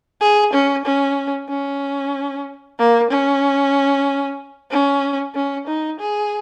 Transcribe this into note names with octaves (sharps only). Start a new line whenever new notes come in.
G#4
C#4
C#4
C#4
A#3
C#4
C#4
C#4
D#4
G#4